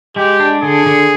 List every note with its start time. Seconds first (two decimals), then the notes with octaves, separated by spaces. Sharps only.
0.16 G#3 G4
0.40 D4
0.63 D3 G#4
0.86 D3